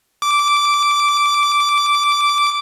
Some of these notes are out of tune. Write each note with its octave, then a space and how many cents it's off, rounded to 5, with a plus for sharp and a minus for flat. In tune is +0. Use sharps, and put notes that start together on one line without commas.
D6 -10